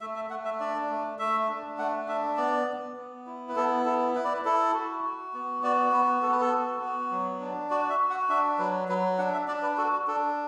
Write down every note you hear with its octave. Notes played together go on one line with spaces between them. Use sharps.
A3 E5
E5
A3 F#5
E5
D4 D5
A3
A3 E5
D4
A3 F#5
D4 E5
B3 D5
B3
B3
E4
B4
B3 A4
E4 A4
E4 B4
D5
B4
E4 A4
F#4
F#4
B3
F#4 D5
B3 B4
B3 A4
B4
A4
F#4
B3
F#3
D4
F#4 D5
E5
F#4
F#5
D4 E5
F#3 B4
F#3 B4
D4 F#5
E5
D4 D5
B4
F#4 A4
F#4
D4 A4